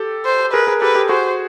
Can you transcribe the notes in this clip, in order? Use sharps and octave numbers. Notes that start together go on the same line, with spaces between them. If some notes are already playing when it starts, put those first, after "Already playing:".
Already playing: G4 A4
C5
G#4 A#4 B4
G#4 A#4
G4 A4 B4
G4 A4
F#4 G#4 C5